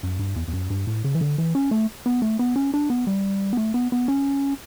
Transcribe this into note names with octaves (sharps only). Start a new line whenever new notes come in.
F#2
G2
E2
E2
F#2
G2
A2
C#3
E3
D3
E3
C#4
A3
B3
A3
B3
C#4
D4
B3
G3
B3
A3
B3
B3
C#4